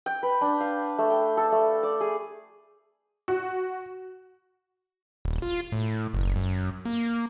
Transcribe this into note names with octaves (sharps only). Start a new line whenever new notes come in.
G5
B4
D4
F5
A3
G5
A4
A3
D5
G#4
F#4
D#1
F4
A2
F#1
F#2
A#3